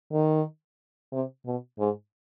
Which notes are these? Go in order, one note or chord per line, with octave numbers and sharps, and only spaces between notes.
D#3
C3
B2
G#2